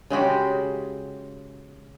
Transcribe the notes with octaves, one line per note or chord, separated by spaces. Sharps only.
C#3 G#3 F#4 G4